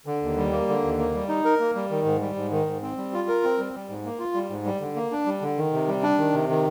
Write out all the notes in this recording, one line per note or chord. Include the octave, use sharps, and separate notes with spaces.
D3
D#2
G3
A#3
D3
D#2
A#3
G3
D#4
A#4
A#3
G3
D#3
G#2
G3
G#2
D#3
G#2
C4
G3
F4
A#4
C4
G3
G3
G#2
A#3
F4
G3
G#2
G3
D3
A#3
D4
G3
D3
D#3
C3
G3
D4
D#3
C3
D#3